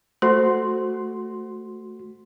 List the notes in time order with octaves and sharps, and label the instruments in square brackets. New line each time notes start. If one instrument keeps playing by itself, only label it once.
[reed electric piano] A3 F#4 C6 [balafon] C5